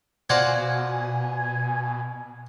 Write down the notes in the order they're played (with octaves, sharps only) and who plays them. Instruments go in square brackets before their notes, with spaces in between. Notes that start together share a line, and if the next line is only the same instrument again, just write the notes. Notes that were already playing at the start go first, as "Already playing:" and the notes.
[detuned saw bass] B2 [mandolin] F4 F#4 F5 [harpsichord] C5 D5 F#5 [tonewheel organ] G#5